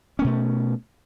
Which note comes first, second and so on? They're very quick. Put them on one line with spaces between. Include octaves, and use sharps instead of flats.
C#4 A#3 B2 A3